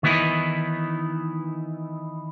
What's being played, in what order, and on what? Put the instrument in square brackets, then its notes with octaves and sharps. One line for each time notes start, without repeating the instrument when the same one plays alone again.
[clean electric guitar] D#3 E3 B3 D#4 E4